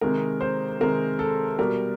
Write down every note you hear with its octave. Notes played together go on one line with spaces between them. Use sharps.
C3 D#3 G#3 A#4
C5
C3 D#3 G#3 A#4
A4
B2 G3 A#4